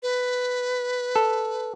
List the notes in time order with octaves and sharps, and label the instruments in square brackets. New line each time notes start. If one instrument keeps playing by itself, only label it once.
[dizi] B4
[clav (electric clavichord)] A4